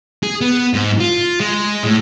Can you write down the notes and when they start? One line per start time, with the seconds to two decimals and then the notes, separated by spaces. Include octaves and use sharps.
0.23 G#4
0.41 B3
0.74 G#2
1.00 F4
1.40 G#3
1.84 A2